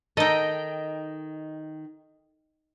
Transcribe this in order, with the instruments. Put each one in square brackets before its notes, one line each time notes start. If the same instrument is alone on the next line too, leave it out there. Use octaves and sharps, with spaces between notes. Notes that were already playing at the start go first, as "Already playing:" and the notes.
[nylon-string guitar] D#3 [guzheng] D#4 A4 [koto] D#5 G5